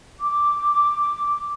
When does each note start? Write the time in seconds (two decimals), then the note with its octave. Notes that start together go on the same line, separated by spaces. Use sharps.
0.20 D6